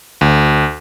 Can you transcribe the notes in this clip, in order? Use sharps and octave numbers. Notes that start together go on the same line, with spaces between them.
D2